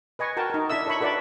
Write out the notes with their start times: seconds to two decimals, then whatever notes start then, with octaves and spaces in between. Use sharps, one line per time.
0.19 B4 D#5 G#5 C#6
0.37 F#4 A#4 G5 A5
0.50 D#4 A#4
0.69 D4 E4 A4 E5 E6
0.87 A4 C#5 E5 B5 C#6
1.00 F#4 A4 B4 D5 E5 B5